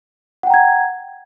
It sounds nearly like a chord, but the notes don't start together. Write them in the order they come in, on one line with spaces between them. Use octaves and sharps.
F#5 G5 A#5 G#6